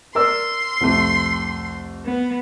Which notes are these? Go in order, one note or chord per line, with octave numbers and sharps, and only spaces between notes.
A#4 D5 C6 E6
C2 F2 A3
B3